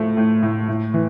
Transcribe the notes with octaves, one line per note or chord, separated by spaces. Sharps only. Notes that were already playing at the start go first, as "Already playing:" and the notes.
Already playing: A2 F3 A3
A2
A2
A2
E3